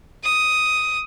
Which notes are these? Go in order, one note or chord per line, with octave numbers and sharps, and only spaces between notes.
D#6